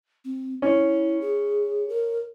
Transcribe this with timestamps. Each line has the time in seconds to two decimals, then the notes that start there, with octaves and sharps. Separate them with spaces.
0.25 C4
0.62 C#4 E4
1.21 G#4
1.89 A#4